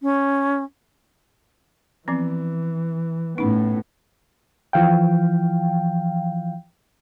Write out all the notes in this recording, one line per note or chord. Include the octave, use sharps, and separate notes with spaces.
C#4
E3 F3 B3 C4
A2 B3 C#4 D#4
E3 F3 F5 G5